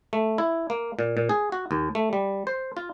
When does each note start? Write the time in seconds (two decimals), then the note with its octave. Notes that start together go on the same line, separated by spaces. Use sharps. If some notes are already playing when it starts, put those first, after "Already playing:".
0.13 A3
0.38 E4
0.70 A#3
0.99 A#2
1.17 A#2
1.29 G#4
1.52 F#4
1.71 D#2
1.95 A3
2.13 G3
2.47 C5
2.77 F4